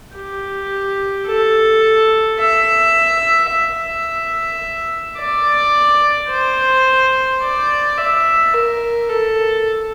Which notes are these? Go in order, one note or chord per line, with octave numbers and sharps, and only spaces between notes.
G4
A4
E5
E5
D5
C5
D5
E5
A#4
A4